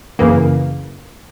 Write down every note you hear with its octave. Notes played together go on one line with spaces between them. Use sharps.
F#2 C#3 E3 A#3